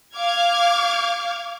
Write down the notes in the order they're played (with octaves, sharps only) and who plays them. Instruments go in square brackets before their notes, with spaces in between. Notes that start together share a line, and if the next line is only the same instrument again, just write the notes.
[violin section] F5 D6 F6 G#6